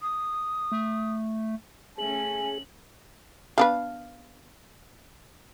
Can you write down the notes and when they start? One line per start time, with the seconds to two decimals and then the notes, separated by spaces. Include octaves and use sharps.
0.01 D#6
0.72 A3
1.98 A3 C#4 G#4 G#5 F#7
3.58 B3 D4 B4 F5